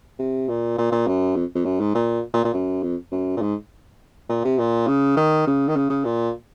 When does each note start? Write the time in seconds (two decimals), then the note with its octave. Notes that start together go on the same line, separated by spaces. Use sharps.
0.19 C3
0.49 A#2
0.78 A#2
0.92 A#2
1.07 F#2
1.36 F2
1.55 F2
1.65 F#2
1.80 G#2
1.95 A#2
2.34 A#2
2.44 A#2
2.54 F#2
2.83 F2
3.12 F#2
3.37 A#2
3.42 G#2
4.29 A#2
4.45 C3
4.58 A#2
4.88 C#3
5.17 D#3
5.47 C#3
5.68 D#3
5.76 C#3
5.90 C#3
6.05 A#2